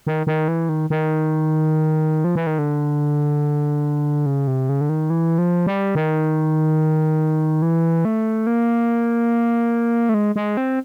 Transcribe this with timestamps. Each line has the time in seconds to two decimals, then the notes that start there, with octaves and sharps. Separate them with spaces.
0.07 D#3
0.27 D#3
0.48 E3
0.69 D#3
0.90 D#3
2.24 F3
2.36 E3
2.47 D#3
2.59 D3
4.26 C#3
4.47 C3
4.69 C#3
4.81 D3
4.89 D#3
5.10 E3
5.38 F3
5.67 G3
5.95 D#3
7.62 E3
8.05 A3
8.47 A#3
10.09 A3
10.14 G#3
10.36 G#3
10.57 C4